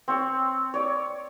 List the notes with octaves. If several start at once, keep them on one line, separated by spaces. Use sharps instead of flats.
C4 C#5
C#5 D5